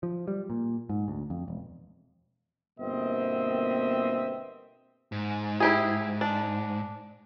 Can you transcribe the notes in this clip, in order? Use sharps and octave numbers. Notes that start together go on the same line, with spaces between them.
F3
G3
A#2
G#2
D2
F2
E1
G1 B2 A#3 C4 D#5 E5
G#2
E4 G4 G#4
D4